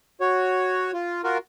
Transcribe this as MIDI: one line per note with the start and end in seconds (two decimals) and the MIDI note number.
0.21 0.91 66
0.21 0.91 73
0.94 1.22 65
1.24 1.38 65
1.24 1.38 66
1.24 1.38 70